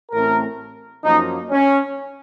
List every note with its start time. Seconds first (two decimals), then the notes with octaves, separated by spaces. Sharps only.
0.12 A1 A2 A3 C4 A#4
1.04 F#2 F3 A#3 D#4
1.51 C#4